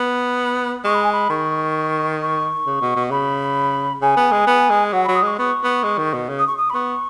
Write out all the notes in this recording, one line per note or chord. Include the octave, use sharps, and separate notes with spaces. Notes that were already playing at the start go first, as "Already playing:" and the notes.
Already playing: B3
G#3 C#6
B5
G#5
B5
D#3 C#6
C#6
C#3
B2
B2
C#3 B5
C#3 G#5
B3
G#3
B3
G#3
F#3 F#5
F#3 B5
D#6
G#3 C#6
B3 C#6
B3
G#3
D#3
B2
C#3
D#6
C#6
D#6
B5
B3 C#6